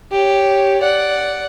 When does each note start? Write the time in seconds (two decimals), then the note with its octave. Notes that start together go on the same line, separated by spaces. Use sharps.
0.12 G4 C#5
0.81 D5 F#5